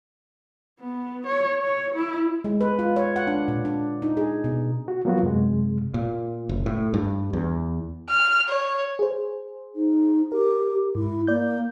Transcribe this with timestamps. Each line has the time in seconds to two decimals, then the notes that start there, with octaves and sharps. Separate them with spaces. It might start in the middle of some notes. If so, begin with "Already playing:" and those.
0.80 B3
1.27 C#5
1.62 C#5
1.94 E4
2.44 G#3
2.61 B4
2.79 F4
2.96 C#5
3.16 F#5
3.27 D4
3.48 A#2
3.65 D4
4.02 D#4
4.17 G#4
4.44 B2
4.88 F#4
5.05 F3 F#3 A#3 B3 F4 F#4
5.23 F#2 C3 G#3
5.94 A#2
6.49 F#1
6.66 A2
6.94 G2
7.33 E2
8.09 F6
8.48 C#5
8.99 G#4 C5
9.75 D#4
10.32 G4 A#4
10.95 G#2 E4
11.27 A#3 D5 G6